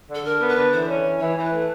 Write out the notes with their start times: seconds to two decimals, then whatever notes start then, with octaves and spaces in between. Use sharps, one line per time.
0.09 D3
0.15 A4
0.25 D3 A#4
0.41 B3
0.49 B4
0.57 D3
0.72 E3 C5
0.88 C#4
1.05 E3
1.20 E3 C#5
1.37 E3 C5
1.44 B4
1.52 A3